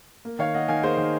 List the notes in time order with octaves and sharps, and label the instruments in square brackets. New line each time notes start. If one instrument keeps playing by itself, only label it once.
[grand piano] A#3
D#3 C#5 F5
A#3 D#5 F#5
D#3 F5 G#5
A#3 G#4 C5
D#3